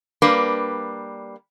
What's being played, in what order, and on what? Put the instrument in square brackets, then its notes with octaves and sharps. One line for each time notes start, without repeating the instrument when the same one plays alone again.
[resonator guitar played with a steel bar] G3 A#3 D4 B4